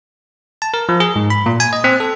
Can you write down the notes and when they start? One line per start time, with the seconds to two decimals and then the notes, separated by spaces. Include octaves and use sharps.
0.62 A5
0.74 A#4
0.89 F3
1.00 G#4
1.16 G#2
1.30 B5
1.46 A#2
1.60 G#5
1.73 D#5
1.84 C4
2.00 A4